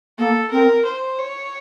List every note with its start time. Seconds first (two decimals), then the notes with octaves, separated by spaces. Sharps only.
0.19 A#3 A4
0.52 C4 A#4
0.85 C5
1.19 C#5